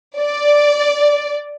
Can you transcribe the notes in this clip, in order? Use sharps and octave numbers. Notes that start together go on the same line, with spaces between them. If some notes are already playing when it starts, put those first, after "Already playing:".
D5